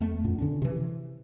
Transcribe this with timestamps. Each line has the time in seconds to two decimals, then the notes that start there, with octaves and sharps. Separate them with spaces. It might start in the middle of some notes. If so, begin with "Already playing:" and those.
0.01 E2 A3
0.24 F#2 A#2 B3
0.39 D3 C#4 D4
0.62 C3 E3